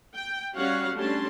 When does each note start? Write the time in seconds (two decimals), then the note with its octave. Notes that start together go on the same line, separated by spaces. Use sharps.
0.15 G5
0.55 G3 C#4 F#4 C#5 F5 F#5
0.96 G3 A3 C#4 D4 A5 C6